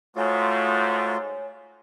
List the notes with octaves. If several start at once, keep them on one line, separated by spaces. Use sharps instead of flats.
G#2 A3 F4 F#4 C#5 G#5